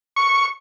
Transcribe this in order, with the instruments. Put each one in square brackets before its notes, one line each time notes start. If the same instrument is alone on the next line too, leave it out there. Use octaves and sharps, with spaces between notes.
[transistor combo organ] C#6